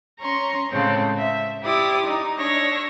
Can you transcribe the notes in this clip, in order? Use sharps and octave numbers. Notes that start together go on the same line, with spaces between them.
C#4 A#5 C6 C#6
A2 C#3 G#3 C4 A4 F5
E5
E4 G4 C5 D5 D6 D#6
D#4
D4 C#5 E6 A#6